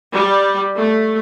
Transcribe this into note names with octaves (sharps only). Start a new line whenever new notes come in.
G3
A3